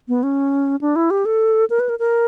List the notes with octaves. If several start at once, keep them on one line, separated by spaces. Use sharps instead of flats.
B3
C#4
D4
E4
G4
A4
A#4
B4
A#4
A#4